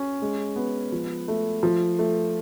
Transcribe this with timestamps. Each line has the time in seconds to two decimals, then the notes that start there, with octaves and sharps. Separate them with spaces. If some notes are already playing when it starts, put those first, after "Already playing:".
Already playing: C#4
0.22 G#3
0.56 B3
0.92 F3
1.28 A3
1.63 F3
1.99 A3